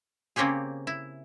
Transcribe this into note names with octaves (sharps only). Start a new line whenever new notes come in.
C#3 A#3 C4 C#4 G4 G#4
E4